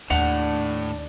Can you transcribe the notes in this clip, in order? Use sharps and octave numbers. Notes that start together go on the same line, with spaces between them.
D#2 A2 D4 F#5 C#7 F7